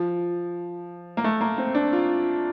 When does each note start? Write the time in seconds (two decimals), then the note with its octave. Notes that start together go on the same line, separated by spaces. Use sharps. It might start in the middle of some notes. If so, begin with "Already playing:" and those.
Already playing: F3
1.17 A#3
1.24 A3
1.41 A#3
1.58 C4
1.75 D4
1.93 F4